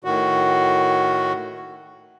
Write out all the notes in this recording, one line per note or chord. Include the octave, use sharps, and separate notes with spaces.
A2 D#3 F#4